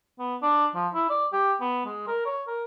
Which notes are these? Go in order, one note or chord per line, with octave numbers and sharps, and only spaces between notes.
B3
D4
F3
E4
D5
G4
B3
G#3
A#4
C#5
A#4